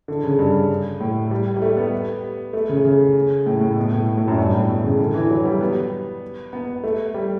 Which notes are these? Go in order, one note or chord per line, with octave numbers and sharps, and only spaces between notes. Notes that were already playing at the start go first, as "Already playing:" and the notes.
D3
C#3
G2
A2
G3
G3
A3
B3
A3
C#3
C#3
A2
A2
B2
A2
A2
F#2
G2
A2
B2
C#3
D3
E3
F#3
G3
B3
B3
A3
G3